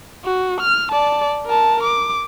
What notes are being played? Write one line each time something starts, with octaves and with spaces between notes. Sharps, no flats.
F#4
F6
D5 A5
A#4 A5
D6